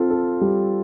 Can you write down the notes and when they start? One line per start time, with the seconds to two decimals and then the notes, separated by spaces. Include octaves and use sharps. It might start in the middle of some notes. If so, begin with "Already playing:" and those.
Already playing: C4 F4 A4
0.10 A4
0.41 G3